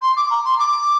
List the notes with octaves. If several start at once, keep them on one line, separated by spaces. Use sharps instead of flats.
C6
D6
A#5
C6
D6